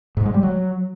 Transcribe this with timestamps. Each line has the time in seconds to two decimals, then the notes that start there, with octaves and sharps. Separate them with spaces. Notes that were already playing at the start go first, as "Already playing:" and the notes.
0.17 G#2
0.25 G#3
0.34 G3
0.43 F#3